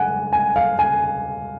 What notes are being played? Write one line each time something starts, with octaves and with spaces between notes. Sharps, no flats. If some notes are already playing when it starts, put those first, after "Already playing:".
Already playing: F#5 G#5
G#5
F5
G#5